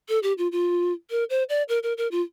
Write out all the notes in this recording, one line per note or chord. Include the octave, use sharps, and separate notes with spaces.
A4
G4
F4
F4
A#4
C5
D5
A#4
A#4
A#4
F4